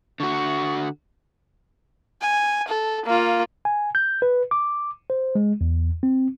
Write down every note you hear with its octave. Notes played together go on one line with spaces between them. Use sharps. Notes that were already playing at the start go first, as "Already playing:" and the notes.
D3 F#4 C#6
G#5
A4
A#3 F4
G#5
G6
B4
D6
C5
G#3
E2
C4